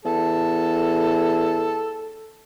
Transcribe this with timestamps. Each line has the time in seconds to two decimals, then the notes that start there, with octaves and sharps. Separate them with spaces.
0.05 E2 A4